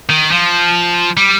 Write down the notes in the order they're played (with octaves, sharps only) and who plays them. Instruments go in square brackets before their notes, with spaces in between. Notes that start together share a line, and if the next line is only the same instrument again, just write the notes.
[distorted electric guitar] D#3
F3
G3